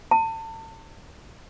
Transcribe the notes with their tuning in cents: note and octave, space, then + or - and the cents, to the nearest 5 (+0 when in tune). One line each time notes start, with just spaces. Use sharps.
A5 +35